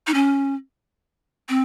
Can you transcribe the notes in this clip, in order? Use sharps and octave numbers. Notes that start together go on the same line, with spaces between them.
D#4
C#4
C4